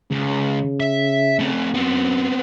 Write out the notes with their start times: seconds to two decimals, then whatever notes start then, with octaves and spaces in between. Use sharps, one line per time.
0.11 C#2 C#3
0.80 E5
1.39 A3 C4
1.74 F#2 B3 C4